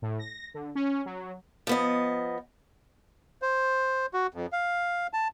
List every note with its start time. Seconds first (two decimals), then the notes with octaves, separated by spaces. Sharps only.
0.02 A2
0.19 A#6
0.54 D3
0.75 C#4
1.06 F#3
1.67 F3 B3 D#5
3.42 C5
4.14 F#4
4.34 F2
4.53 F5
5.13 A5